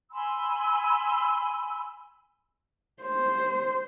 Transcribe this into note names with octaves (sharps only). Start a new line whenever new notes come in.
G#5 B5 C6 E6
C5